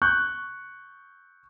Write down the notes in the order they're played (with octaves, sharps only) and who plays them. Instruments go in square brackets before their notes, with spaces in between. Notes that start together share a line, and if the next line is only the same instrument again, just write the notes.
[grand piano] C#6 F#6 G6